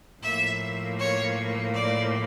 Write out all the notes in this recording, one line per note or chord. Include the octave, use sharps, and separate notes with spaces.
A2 F3 A#3 E5
C#5
D5